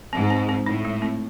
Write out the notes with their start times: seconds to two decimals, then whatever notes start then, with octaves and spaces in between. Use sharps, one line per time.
0.13 G#2 C4
0.30 C4
0.49 C4
0.66 A2 D#4
0.85 G#3
1.02 C4